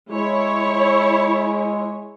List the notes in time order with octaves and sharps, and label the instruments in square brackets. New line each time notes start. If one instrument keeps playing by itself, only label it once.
[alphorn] G#3 [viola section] E4 C#5